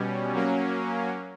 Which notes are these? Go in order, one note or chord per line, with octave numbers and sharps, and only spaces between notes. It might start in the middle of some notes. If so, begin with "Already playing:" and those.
Already playing: B2 G3 C#4
F#3 A#3 C#4